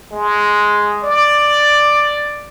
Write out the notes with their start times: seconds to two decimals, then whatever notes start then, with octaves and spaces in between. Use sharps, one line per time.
0.12 G#3
1.04 D5